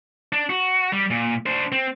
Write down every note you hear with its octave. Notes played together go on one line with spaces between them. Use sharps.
D4
F#4
G3
A#2
D4 C5
C4